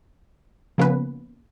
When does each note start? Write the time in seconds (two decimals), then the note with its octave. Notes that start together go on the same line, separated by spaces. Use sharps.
0.78 C#3 F3 A#3 B3 C#4 B4